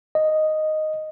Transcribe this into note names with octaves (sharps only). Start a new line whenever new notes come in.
D#5